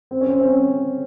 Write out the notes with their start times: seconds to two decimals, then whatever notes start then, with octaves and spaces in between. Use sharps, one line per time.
0.11 C4
0.21 C#4
0.30 C4
0.41 C#4